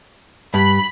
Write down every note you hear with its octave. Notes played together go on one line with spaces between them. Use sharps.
G2 B5